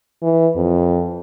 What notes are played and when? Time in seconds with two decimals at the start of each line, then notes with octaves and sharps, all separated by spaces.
0.22 E3
0.56 F2